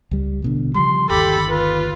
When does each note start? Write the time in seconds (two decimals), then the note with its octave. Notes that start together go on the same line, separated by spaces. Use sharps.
0.11 C#2 G3
0.42 A1 B2 D3
0.75 C#3 F3 G3 C6
1.10 G1 D#2 G4 A4 B5
1.49 F4 B4